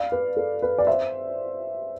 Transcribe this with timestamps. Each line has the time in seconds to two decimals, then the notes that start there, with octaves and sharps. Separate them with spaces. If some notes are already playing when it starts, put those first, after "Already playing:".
Already playing: D5 F5
0.12 B4
0.37 A4
0.62 B4
0.78 D5
0.87 C5 E5